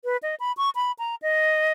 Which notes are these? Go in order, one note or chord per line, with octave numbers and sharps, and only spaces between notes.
B4
D#5
B5
C#6
B5
A#5
D#5